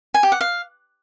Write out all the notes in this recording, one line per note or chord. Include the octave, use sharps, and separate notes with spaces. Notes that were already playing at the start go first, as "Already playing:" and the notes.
G#5
G4
F#5
F5